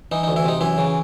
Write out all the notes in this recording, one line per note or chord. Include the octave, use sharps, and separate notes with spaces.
E3 D#4
D#4
D2
E3 E4
C3 D#4
F#2 E3 E4
C#3